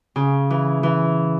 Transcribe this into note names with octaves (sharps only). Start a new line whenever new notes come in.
C#3
E3
E3